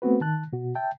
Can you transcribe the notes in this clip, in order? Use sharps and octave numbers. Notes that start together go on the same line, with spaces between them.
A3 B3 C4 F#4 B4
D#3 A5 F#6
B2 F#4
E5 G5 A5